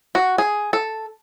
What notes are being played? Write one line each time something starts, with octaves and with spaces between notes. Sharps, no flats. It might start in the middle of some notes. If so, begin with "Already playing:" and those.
F#4
G#4
A4